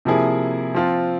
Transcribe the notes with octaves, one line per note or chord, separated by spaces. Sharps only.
C3 F3 A#3 E4 G#4
F3 C4 F4